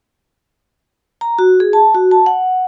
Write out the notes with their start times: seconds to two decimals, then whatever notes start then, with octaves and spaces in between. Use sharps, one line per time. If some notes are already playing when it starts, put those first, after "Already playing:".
1.21 A#5
1.39 F#4
1.60 G#4
1.73 A5
1.95 F#4
2.11 A5
2.26 F#5